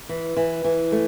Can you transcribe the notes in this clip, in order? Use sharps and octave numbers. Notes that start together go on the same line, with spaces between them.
E3
E3
E3
A3